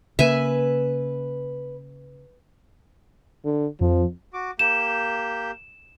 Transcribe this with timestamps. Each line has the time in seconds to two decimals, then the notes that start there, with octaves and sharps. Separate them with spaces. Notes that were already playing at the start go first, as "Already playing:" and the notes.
0.19 C#3 A#3 B4 E5 G#5
3.45 D3
3.81 F2 F3
4.34 F#4 D6
4.59 A#3 G4 G6 E7